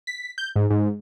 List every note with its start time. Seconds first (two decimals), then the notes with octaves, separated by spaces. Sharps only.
0.07 B6
0.38 G6
0.56 G#2
0.70 G#2